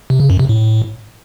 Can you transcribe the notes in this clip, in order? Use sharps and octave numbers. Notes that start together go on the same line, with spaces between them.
C3
C#3
F#2
C3
A2